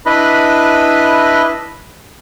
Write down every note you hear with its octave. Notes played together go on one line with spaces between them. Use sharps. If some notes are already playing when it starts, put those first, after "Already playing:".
D4 E4 B4 D#5 B5